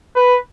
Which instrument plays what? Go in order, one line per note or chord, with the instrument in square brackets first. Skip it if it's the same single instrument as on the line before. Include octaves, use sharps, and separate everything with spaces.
[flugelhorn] B4